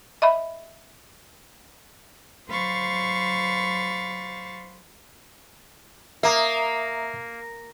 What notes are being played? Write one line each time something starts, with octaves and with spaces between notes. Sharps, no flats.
D#5 E5 B5
F#3 C5 F5 B5 C#6 A6
A#3 E5 A#5 D#6